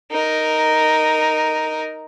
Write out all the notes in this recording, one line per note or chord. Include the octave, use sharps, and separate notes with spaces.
D#4 A#4